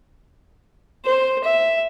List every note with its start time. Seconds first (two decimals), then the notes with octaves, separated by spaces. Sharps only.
1.05 C5
1.44 E5